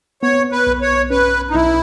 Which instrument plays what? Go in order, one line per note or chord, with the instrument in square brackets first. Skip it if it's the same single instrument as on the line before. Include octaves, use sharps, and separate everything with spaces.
[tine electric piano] B3 [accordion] C#5
[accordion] B4
[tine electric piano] B1
[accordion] C#5
[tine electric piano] C#4 [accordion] B4
[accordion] D#4
[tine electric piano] B1 [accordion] E4